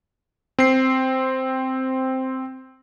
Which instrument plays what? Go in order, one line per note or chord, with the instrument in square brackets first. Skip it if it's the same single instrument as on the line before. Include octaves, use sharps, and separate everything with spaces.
[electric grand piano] C4 C7